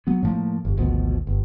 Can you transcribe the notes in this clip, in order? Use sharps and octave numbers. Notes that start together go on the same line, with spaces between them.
F#3 B3
A2 F3 A#3
G1
G#1 D2 B2 F3
G1